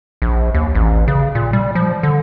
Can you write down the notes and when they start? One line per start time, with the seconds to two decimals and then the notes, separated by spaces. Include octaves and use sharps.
0.22 A#1
0.54 D#2
0.75 A1
1.08 C#3
1.35 A#2
1.53 G3
1.75 F3
2.03 D3